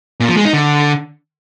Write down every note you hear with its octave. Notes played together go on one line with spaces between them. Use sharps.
A#2
F3
G#3
D#4
D3